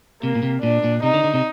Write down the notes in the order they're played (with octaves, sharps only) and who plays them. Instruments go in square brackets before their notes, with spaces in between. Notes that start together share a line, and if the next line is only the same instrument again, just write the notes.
[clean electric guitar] C3 [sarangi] A#3
[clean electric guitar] A#2
C3
[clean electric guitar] A#2 [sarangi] D4
[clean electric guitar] A#2
[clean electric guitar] C3 [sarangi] D#4
[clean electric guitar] D3
D3
C3